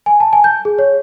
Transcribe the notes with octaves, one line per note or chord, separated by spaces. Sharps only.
G#5
A5
G#5
G6
G#4
C#5